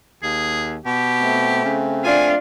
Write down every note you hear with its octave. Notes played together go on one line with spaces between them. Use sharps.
D#2 G#4
B2 G4
A3 C4
C#3
D4 F4 G#5